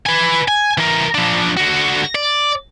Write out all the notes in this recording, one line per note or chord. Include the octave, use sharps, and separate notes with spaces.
B4 G#5
G#5
E3 A#4
F3 D4
D3 F#4
D5